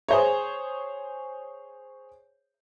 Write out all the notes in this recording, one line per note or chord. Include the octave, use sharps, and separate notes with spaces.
G#4 C5 C#5